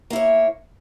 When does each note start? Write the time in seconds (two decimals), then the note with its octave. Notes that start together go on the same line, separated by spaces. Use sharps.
0.10 A#3
0.13 E4
0.16 C#5